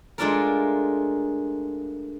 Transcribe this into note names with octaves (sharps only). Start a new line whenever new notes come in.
G#3 A3 D4 F4 A4 A#4